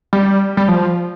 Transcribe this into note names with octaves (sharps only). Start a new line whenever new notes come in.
G3
G3
F3